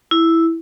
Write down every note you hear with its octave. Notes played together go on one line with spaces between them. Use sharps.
E4